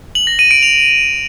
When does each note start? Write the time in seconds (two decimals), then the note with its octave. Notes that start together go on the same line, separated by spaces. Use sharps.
0.15 F#7
0.27 A#6
0.39 D#7
0.51 D7
0.63 F7